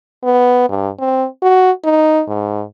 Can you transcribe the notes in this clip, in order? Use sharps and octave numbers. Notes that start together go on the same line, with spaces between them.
B3
G2
C4
F#4
D#4
G#2